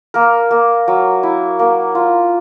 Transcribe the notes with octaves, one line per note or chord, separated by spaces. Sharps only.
A#3 A#4
A#3
F#3
E4
A#3
F4